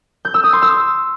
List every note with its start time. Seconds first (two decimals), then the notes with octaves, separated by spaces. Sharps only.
0.25 G6
0.34 E6
0.43 D#6
0.53 C6
0.62 E6